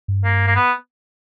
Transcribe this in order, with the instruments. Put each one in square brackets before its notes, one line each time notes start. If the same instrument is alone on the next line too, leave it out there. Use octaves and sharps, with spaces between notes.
[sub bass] G2
[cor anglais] A#3
A#3
B3